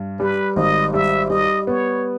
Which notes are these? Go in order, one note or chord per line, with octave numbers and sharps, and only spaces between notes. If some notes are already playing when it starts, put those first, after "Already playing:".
Already playing: G2
G3 B4
G#1 D#5
G3 E5
G3 D#5
B3 C#5